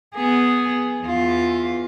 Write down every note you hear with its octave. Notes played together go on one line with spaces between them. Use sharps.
B3 G#4
E2 F4